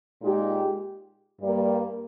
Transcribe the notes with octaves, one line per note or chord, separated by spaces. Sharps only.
A#2 G#3 D#4 G4
G2 G3 A#3